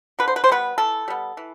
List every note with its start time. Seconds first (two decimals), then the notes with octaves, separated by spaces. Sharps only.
0.19 D3 B4
0.28 C5
0.36 B4
0.44 C5
0.49 G3 B3 B4
0.78 E3 A4
1.08 G3 B3
1.37 E3